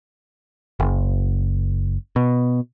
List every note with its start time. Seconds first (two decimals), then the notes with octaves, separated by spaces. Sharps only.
0.80 F#1
2.16 B2